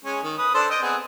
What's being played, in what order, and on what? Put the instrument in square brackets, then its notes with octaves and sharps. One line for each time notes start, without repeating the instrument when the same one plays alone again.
[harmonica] G#3 C#4
D#3
B4 D#6
D4 A4 C5
D#5 G5
B3 C4 G#4